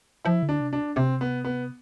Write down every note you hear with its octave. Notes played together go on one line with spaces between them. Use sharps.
F3 E4
D3
D4
C3
D4
C3 C4
B3
B3